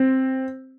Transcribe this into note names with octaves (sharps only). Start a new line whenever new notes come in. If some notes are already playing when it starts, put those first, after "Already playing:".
Already playing: C4